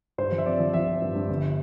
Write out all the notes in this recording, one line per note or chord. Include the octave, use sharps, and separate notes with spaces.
G2 C5
F3
E5
C4 D5
F3
F3 E5
C4
G2
G2
G1